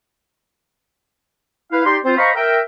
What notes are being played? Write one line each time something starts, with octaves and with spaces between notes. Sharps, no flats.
E4 B4 F5
D#4 G4 D5 G5 C6
C4 F4 C5
C5 D#5 F5 A#5 B5 C#6
A#4 E5 G5